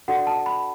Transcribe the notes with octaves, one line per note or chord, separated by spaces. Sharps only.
D4 F#4 A4 D5 F#5
A5
B5